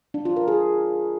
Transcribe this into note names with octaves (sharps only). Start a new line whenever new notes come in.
D4
F4
A#4
G#4